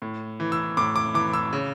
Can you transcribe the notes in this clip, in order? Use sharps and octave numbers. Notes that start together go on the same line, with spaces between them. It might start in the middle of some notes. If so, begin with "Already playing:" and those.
A2
E3
E6
A2 D6
D6
E3 D6
E6
C#3